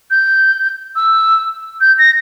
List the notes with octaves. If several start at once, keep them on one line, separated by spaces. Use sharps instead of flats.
G6
E6
G6
A#6